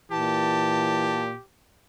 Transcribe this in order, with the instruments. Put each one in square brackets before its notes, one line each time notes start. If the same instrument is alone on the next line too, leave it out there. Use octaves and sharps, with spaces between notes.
[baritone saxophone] A#2 [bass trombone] E3 [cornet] G4 [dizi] A5